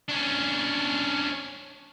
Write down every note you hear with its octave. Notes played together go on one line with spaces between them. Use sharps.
C#4 D4